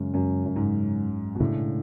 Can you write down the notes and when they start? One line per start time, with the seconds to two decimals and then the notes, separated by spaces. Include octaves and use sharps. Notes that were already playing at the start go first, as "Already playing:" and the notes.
Already playing: F#2 C#3 G#3 C#4
0.14 F#2
0.46 F#2
0.56 G#2
1.35 B2
1.40 A2 C#3 G#3 D4